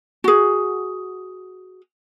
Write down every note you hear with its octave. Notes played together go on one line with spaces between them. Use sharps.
F#4 G#4